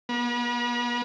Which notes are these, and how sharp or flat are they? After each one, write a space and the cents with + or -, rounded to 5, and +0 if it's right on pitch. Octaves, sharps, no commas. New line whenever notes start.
B3 -40